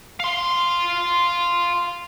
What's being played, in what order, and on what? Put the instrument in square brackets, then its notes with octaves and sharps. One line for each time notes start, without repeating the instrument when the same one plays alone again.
[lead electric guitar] F5 C6